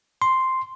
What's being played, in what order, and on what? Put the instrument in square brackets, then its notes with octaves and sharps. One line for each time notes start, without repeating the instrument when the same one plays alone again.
[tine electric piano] C6